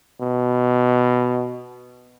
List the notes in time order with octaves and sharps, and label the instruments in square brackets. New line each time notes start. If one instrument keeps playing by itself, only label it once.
[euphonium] B2